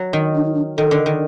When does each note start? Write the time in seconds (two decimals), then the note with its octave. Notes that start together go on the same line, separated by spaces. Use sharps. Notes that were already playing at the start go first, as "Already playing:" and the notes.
Already playing: F#3
0.13 D#3
0.35 D4
0.45 D#4
0.54 D4
0.77 D#3 A4
0.91 D3
1.06 D#3